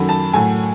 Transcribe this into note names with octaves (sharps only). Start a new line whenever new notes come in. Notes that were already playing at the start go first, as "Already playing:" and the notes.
Already playing: F#2 D#3 F#3 A3 B5
A5
A2 F#3 A3 G#5